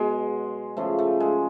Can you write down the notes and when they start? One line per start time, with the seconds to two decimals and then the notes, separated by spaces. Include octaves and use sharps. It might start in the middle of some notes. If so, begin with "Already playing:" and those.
Already playing: B2 F#3 G#3
0.77 C#3 F3 A3
0.99 A3
1.20 G#3